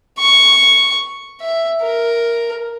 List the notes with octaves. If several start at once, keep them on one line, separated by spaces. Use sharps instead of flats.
C#6
E5
A#4